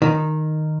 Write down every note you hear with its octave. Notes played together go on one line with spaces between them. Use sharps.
D#3